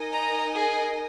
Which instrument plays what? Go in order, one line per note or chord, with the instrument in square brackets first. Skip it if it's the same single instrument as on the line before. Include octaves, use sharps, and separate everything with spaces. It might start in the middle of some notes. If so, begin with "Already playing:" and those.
Already playing: [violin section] D#4 A#4 D#5 G#5
[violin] A#5
G#4